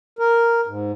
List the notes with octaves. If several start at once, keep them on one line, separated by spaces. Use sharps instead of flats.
A#4
G#2